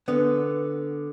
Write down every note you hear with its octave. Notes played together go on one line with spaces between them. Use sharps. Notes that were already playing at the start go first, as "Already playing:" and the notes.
D3 B3